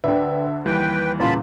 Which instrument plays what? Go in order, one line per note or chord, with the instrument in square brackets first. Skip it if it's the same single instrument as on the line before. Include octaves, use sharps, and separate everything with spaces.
[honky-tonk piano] D2 D3 [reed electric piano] B4 D5 G5 [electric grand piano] E5
[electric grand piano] D#2 E3 [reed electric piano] G3 [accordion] B4 G5
[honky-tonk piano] E2 A#2 C#3 [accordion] F4 A5 B5